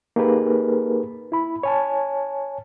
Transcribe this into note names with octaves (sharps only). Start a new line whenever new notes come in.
A#3 D#4 G4 G#4 A#4 B4
E4 B5
C#5 G#5 A5